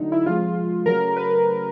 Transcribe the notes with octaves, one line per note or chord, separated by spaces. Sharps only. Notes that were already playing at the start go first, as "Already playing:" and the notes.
Already playing: D3 F#3 A3 D#4
E4
C3 F3 G#3 F4
C#3 F#3 A3 A#4
B4